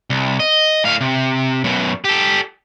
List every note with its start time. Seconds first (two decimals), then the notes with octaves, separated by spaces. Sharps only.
0.10 C2
0.40 D#5
0.84 A2 F5
1.01 C3
1.64 F#2 B2
2.04 G4 A4